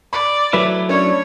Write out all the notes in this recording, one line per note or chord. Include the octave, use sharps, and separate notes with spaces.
D5 B5
F#3 A3 E4 B4 B6
C#4 D4 C#5